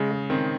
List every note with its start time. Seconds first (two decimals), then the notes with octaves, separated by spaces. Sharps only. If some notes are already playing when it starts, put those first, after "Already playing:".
Already playing: C#3 G#3
0.11 G#3
0.30 D#3 C4